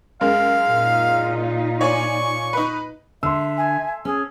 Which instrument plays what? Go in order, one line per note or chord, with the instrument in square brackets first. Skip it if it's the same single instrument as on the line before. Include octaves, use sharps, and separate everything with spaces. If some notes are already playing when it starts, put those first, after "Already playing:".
[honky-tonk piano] F#2 G#3 A#4 [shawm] F5
[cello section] A#2 D#4 F4
[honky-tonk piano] C#5 D5 G#5 [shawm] C#6
[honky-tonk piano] D#4 B4
[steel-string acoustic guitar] D3 [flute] E5 [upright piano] C6 E6
[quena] G#5
[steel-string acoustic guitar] C#4 [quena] G#4